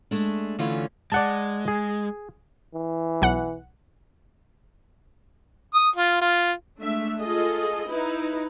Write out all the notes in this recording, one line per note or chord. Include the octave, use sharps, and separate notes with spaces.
G#3 A3 D4
D3 E3 A3 C#4 F4
G#3 D5 F#5 A5
G#4
E3
B1 F#5
D#6
F4
F4
G#3 A3 D4 E5
F4 G#4 A4 D#5
D#4 E4 B4